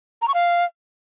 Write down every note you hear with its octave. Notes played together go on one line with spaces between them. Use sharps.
A#5
C#6
F5